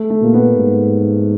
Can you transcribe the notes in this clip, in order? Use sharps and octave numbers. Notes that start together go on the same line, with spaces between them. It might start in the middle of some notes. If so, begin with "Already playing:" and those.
Already playing: A3
A3
A#2 A#3
B3
G#2